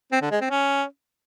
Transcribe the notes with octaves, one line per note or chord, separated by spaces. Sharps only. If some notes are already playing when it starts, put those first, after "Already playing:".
C4
D3
G#3
C4
C#4